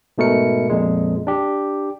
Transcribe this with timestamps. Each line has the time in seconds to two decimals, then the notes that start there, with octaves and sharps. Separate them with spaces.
0.18 G#2 B2 A3 A#4 C#7
0.70 F2 A#2 G#3
1.27 D4 G4